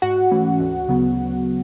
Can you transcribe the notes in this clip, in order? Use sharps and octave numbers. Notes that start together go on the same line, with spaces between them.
G#2 F#4 F#5
E3 A3 C#4
D2
C#3 F#3 B3